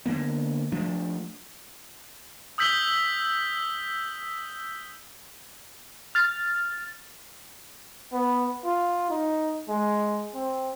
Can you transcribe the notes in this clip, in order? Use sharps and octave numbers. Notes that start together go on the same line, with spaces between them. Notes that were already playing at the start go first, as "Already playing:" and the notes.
D3 D#3 A#3 B3
F3 A3 D4
D#6 E6 G6 B6 F#7 G7
F6 A6
B3
F4
D#4
G#3
C4